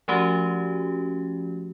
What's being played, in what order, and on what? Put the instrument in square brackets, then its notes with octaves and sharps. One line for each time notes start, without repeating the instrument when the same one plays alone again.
[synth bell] F3 A3 C#4 F#4 G4